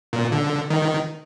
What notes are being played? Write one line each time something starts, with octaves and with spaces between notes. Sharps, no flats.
A#2
D3
D#3